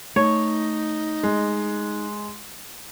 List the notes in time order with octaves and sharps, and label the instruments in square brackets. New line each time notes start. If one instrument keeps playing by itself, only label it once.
[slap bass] A3 [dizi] D#4 [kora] C#5
[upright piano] G#3